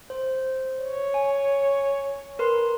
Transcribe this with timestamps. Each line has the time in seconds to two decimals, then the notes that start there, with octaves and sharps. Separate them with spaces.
0.10 C5
0.79 C#5
1.14 G#5
2.39 A#4 B4 C6